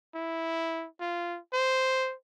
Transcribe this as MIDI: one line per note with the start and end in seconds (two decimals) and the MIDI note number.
0.15 0.87 64
1.00 1.38 65
1.53 2.14 72